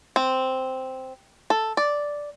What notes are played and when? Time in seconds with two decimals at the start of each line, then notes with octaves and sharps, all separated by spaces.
0.16 C4
1.50 A4
1.77 D5